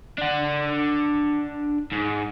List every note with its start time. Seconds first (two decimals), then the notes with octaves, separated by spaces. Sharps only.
0.18 D4 F#5
1.92 G#2